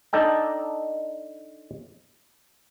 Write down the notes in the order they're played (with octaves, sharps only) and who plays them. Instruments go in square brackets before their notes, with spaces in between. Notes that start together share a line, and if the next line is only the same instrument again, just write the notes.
[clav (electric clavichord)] D4 D#4 A4 D#5 G5